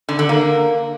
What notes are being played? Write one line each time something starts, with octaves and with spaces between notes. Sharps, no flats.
D3
D3
A#3